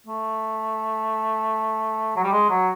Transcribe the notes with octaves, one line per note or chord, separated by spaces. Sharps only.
A3
F#3
G3
G#3
F#3